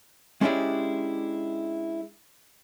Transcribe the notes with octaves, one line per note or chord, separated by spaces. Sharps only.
G#3 C#4 D4 E4 G4 G#4